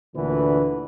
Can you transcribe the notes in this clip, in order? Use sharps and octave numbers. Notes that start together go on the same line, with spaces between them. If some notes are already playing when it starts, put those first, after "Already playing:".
D2 A#2 D3 E3 B4